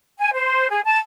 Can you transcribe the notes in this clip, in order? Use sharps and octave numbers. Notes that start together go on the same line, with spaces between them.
G#5
C5
G#4
A5